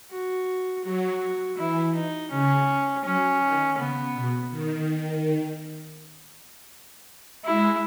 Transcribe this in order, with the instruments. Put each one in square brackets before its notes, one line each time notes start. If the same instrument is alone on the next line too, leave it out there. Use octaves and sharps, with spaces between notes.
[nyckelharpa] F#4
[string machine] F#3 [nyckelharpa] F#4
[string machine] E3 [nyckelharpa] E4
[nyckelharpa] D#4
[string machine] C#3 [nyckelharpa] C#4
[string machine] F#3 [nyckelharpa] C#4
[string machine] D#3
[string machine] C#3 [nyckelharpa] B3
[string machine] B2
D#3
[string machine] G#3 [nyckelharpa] E4